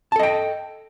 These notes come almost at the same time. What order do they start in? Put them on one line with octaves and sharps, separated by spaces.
A5 A4 D#5 G5